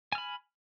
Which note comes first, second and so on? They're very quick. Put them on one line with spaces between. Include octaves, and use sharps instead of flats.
G#5 F6 B5